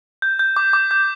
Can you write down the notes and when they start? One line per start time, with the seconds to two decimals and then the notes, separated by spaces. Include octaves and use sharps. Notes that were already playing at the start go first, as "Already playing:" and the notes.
0.22 G6
0.39 G6
0.56 D6
0.73 D6
0.91 G6